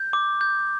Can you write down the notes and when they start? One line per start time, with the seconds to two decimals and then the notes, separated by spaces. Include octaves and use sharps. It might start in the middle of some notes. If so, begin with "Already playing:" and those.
Already playing: G6
0.13 D6
0.41 G6